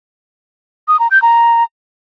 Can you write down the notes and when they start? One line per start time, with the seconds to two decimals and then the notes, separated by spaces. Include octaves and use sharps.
0.88 D#6
0.99 A#5
1.11 G6
1.22 A#5